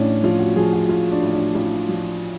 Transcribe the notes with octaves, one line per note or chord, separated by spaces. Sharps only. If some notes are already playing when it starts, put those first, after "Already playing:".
Already playing: A1 A2 C#4 D4
F3 F4
F#4
F3 G#4
F#4
F3 F4
D4
A1
D4
A1 F4
F3